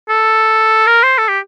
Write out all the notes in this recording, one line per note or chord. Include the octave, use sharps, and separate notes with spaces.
A4
A#4
C5
A4
G4